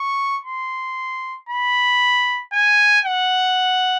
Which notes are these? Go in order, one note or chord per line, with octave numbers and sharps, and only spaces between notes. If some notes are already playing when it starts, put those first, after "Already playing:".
Already playing: C#6
C6
B5
G#5
F#5